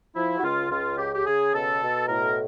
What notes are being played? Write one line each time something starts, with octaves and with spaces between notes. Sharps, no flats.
F3 E4
F#4
C#2 F4
C#2 F4
C#3 G4
G4
C#3 G#4
B2 A4
B2
A2 A#4